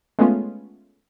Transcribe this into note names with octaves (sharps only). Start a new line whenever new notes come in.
G#3 A3 B3 C#4 F4